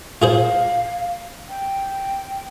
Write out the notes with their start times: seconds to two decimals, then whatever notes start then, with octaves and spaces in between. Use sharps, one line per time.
0.22 F4 G#4 C5 F5
1.49 G5